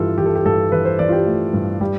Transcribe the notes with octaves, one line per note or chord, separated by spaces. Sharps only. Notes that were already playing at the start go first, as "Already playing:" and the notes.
Already playing: G2 E3 F4 G4 A4
E3 G4
A4
G4
G2 A4
E3 B4
C5
E3 D5
F4
G4
A3
G2
G3